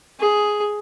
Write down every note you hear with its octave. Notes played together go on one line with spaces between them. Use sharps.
G#4